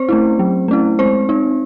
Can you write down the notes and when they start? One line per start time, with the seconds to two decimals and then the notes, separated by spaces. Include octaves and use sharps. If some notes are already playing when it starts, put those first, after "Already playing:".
Already playing: C4 C5
0.09 A3 C#4 E4
0.39 F#3
0.68 A3 C#4 E4
0.99 G#3 C4 C5
1.29 C4 D#4